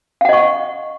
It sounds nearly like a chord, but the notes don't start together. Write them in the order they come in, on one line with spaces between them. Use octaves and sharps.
F5 F#5 D#5 C#6